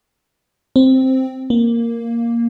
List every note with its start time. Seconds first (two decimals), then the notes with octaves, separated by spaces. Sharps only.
0.76 C4
1.50 A#3